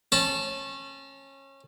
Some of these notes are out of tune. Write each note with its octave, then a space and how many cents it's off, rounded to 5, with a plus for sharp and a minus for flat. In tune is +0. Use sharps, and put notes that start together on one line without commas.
C#4 -25 A5 -5